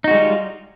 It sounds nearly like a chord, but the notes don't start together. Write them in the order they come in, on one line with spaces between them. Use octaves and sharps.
D#4 F#4 G#3 G3 F4